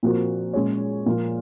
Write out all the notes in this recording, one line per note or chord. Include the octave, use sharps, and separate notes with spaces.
A#2 F3 C4 F#4 A#4
A#2 G#3 C#4 G#4 C#5
A#2 F3 A#3 F4